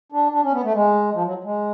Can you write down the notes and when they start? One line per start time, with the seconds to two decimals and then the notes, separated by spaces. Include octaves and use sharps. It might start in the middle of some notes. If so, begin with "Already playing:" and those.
0.12 D4
0.32 D4
0.43 C#4
0.52 B3
0.64 A3
0.73 G#3
1.14 F3
1.25 F#3
1.44 G#3